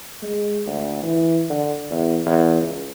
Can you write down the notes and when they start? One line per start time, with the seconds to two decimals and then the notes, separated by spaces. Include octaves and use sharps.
0.22 G#3
0.66 D2
1.03 E3
1.50 D3
1.91 E2
2.26 E2
2.62 C#2